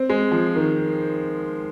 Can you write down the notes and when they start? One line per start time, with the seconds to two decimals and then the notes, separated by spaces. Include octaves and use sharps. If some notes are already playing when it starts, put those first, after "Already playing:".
Already playing: C4
0.09 G#3
0.32 F3
0.56 D#3